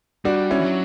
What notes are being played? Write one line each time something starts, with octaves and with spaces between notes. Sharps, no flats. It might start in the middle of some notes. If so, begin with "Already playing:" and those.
G3 D4 F#4
C#4 E4
E3
F#3